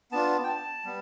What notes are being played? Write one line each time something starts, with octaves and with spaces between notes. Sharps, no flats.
B3 D4 F4 A5
G5
A5
G3 B3